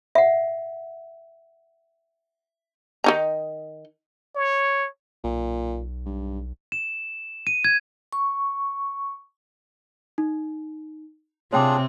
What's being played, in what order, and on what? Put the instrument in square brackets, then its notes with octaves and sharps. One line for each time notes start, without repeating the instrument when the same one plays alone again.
[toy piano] E5 F#5
[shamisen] D#3 D#4 A#5
[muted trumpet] C#5
[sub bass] B1 [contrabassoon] A#2
[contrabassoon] G2
[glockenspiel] E7
D#7
G#6
[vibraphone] C#6
[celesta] D#4
[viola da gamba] C3 C4 [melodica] D4 F4 G#4 [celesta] C#5 G5 D6